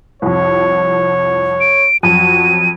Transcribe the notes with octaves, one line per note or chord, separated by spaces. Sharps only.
C2 F2 C#5
D7
F2 F#3 F#4 D#7